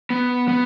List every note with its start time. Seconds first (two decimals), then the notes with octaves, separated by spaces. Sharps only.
0.10 B3
0.48 B3